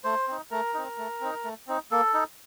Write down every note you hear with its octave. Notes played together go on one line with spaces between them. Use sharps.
A3 C5
C4 D#4
A3 A#4
C4 D#4
A3
C4 D#4
A3
C4 D#4
A#3 A4
D#4